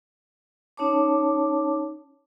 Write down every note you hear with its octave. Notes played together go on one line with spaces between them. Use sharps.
C#4 D#4 C#5 A5 D6